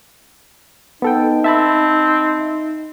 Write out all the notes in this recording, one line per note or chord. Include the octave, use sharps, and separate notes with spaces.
B3 D#4 A4 G5
C4 E5 A5 B5